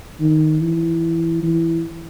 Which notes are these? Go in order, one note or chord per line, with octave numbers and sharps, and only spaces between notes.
D#3
E3
E3